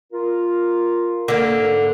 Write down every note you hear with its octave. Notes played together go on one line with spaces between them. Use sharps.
F4 A#4
D3 A#3
G#2